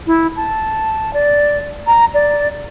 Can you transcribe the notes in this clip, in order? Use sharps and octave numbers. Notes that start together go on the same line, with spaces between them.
E4
A5
D5
A#5
D5